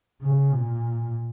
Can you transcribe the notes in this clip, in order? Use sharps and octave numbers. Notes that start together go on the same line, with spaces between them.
C#3
A#2